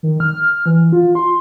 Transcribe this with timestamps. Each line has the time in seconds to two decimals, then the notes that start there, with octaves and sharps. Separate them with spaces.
0.03 D#3
0.20 F6
0.66 E3
0.93 F4
1.15 C6